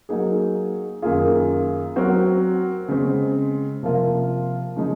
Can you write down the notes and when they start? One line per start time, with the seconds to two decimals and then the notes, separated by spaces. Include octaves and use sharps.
0.09 F#3 A#3 D#4 G#4
1.02 F#2 D#3 A#3 F4 G#4
1.96 F#3 C4 F#4 A#4
2.89 C#3 G#3 C4
3.83 C3 F3 A#3 F4 A#4
4.76 C#3 F3 G#3 D#4